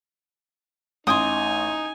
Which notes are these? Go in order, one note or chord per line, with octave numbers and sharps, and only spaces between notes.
A1 D#4 G#5 C6 D6 D#6